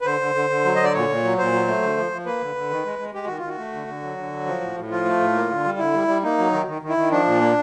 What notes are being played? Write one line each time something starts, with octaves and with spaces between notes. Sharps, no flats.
B4
D3 C5
D3
D3
D3
F#3
D#5
D3 D5
A#2 C#5
A#2
F#3
A#2 C5
F#3
A3
D3
F3
F3
A#3 B4
D3
D3
D#3
G#3
G#3
G#3 G4
D#3 F#4
F4
D#3
F#4
A3
D3
D3
F#3
D3
F#3
F3
A2
A2
F3 F4
A3
A2
A#3
D3
G3
D3 E4
G3
G3
A#3 D#4
F#3
D#3
D#3
D#3
E4
D#3
F3 D4
A#2
A#3